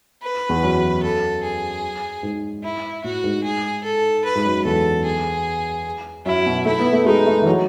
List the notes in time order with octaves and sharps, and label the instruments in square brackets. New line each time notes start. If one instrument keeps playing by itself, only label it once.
[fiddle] B4
[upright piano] E2
F#2
[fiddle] A4
G#4
[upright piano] G#2
[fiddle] E4
[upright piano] A2 [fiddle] F#4
[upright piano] G#2
[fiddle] G#4
A4
B4
[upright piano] G#2
F#2
[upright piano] E2 [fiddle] A4
[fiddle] G#4
[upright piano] F#2 [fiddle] E4
[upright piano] B2
[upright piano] A3 [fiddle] E4
[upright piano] B3
A3
[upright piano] G#3 [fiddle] D#4
[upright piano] A3
E3
F#3